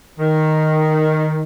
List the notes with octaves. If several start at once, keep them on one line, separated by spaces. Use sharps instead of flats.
D#3